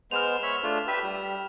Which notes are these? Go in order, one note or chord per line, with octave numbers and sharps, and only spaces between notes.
G#3 B3 C5 F6 E7 F7
C#5 E5 B5
A3 D4 F4
G4 B4 E5
G3